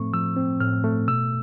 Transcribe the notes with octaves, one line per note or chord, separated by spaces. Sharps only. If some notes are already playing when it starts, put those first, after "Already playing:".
Already playing: A2 F3 A3 C4 C#6
F3 E6
C4
A2 F6
A3
B2 E6